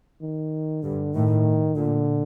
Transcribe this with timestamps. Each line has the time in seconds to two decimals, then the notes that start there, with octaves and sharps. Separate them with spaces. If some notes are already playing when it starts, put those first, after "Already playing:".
0.22 D#3
0.83 G2 D3
1.14 A2 D#3
1.76 A#2 D3